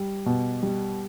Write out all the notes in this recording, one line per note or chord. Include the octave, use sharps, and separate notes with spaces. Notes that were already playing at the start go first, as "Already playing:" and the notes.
Already playing: G3
B2
G3